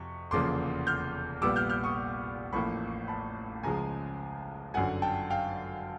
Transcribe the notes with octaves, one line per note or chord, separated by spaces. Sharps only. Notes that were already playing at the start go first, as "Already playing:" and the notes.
Already playing: F2 C3 C#6
F1 E2 C#3 F3 A#3 C6 D6
F6 G6
A#1 A#2 G3 B3 D6 E6
F6 G6
F6 G6
C#6 D#6
A1 A2 F3 A#3 B5 C#6
A5 B5
C#2 C#3 F3 G#3 G#5 A#5
G1 F#2 D3 F#5 G#5
G5 A5
F5 G5